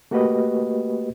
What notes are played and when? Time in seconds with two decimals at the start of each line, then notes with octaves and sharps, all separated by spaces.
0.11 A3 A#3 F#4 G4 B4 D#5